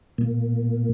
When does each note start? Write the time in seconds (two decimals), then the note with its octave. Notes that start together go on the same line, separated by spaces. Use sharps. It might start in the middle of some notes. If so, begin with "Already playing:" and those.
0.18 A#2